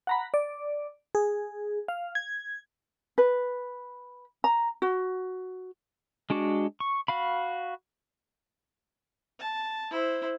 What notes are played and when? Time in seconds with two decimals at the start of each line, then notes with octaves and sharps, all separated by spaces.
0.07 F#5 A#5 B5
0.34 D5
1.15 G#4
1.88 F5
2.15 G#6
3.18 B4
4.44 A#5
4.82 F#4
6.30 G#3 D4 F#4 D6
6.80 C#6
7.08 F#4 F5 B5
9.40 A5
9.91 E4 C5